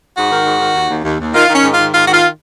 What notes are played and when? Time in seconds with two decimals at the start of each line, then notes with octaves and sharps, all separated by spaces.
0.16 G#2 F#4
0.31 D#3
0.45 G#2
0.61 D#3
0.74 D#2
0.90 D#2
1.04 D#2
1.19 D#2
1.34 D#3 F4
1.48 D#3 C#4
1.63 G#2
1.72 F4
1.78 D#3
1.92 G#2 F4
2.06 D#3 F#4
2.12 F4